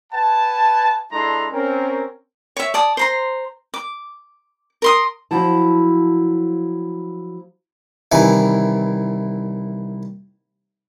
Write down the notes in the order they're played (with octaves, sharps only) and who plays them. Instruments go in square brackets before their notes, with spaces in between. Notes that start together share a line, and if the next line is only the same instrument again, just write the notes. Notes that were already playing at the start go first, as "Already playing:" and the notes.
[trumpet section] B4 F#5 G#5 A5
G#3 D4 E4 A4 A#5 C6
C4 C#4 A#4
[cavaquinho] C#5 E5
D5 A5 D#6
C5 A#5 C6
D6
A#4 C6 D#6
[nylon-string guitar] F3 F#3 E4 A5
[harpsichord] C2 D#3 E3 G#5